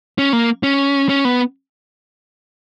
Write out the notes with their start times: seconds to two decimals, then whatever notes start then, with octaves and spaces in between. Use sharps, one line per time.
0.18 C#4
0.33 A#3
0.63 C#4
1.09 C#4
1.25 B3